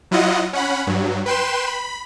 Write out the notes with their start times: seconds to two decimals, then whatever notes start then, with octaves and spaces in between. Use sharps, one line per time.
0.11 F#3 E4 F4 D#5 F#5
0.53 C#4 F#5 B5
0.87 G2 F#3
1.26 B4 G5 C6 E7
1.67 B5